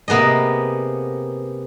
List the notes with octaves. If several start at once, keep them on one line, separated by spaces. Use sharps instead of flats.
C3 A#3 B3 G#4 D#5